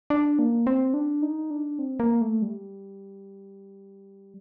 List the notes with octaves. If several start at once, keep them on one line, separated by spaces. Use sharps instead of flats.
D4
A#3
C4
D4
D#4
D4
C4
A#3
A3
G3